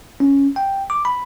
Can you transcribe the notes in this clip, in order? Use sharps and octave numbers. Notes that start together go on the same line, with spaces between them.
C#4
G5
D6
B5